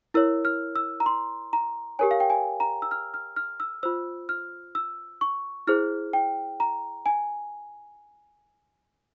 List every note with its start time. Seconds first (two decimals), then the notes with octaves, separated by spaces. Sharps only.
0.14 E4 A#4 C#5 E6
0.45 F6
0.76 E6
1.00 A#5
1.06 C6
1.53 A#5
1.99 G4 A#4 C#5 G#5
2.11 F5
2.20 G5
2.30 G#5
2.60 A#5
2.82 E6
2.91 F6
3.14 F6
3.36 F6
3.60 E6
3.83 F4 C5 E6
4.29 F6
4.75 E6
5.21 C#6
5.67 E4 G#4 C5 F6
6.13 G5
6.60 A#5
7.06 G#5